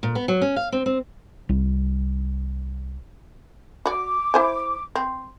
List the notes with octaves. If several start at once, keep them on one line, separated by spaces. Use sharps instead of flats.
A#2
B3
F#3
C#4
F5
C4
C4
C2 G3
F#4 D5 D6
E4 C5 G#5
C4